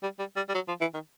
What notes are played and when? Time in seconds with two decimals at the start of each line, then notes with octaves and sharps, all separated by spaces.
0.03 G3
0.19 G3
0.36 G3
0.49 G3
0.55 F#3
0.68 F3
0.81 E3
0.94 D#3